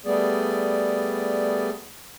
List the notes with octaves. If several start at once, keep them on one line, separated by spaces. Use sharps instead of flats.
G3 A3 B3 G#4 D5